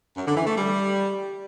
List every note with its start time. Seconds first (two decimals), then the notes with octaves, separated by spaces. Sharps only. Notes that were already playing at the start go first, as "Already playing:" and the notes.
0.16 F#2
0.26 D3
0.36 E3
0.46 A3
0.56 G3